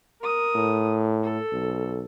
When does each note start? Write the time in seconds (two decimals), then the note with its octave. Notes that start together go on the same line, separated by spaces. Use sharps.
0.21 A#4 D#6
0.55 A2
1.23 A4
1.53 B1